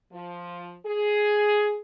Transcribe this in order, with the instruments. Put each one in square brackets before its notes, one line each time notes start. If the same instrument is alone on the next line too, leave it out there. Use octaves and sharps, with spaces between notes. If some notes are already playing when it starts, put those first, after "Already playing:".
[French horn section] F3
G#4